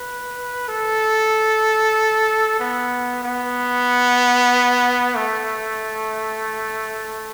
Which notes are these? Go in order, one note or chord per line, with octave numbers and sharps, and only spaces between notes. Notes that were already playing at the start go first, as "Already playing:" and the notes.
Already playing: B4
A4
B3
B3
A3